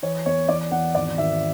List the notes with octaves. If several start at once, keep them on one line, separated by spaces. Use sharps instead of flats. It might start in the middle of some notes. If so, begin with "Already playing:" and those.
E3 C#5
E2 C#5
E2 D5
E2 F#5
G#1 D5
G#1 E5